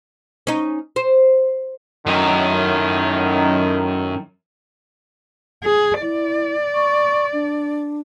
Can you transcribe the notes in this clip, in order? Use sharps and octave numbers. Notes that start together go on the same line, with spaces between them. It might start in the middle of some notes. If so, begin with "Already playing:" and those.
C#4 D#4
C5
F#2 A2 D#3
G#4
E4 D5
C#6
D4